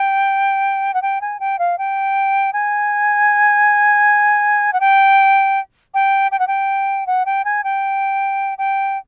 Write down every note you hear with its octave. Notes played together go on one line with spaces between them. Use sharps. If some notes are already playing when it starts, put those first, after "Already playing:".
Already playing: G5
F#5
G5
G#5
G5
F5
G5
G#5
F#5
G5
G5
G5
F#5
G5
F#5
G5
G#5
G5
G5